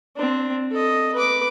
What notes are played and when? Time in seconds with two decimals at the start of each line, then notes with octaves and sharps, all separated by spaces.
0.16 C4 D4
0.71 A4 D#5
1.15 B4 D6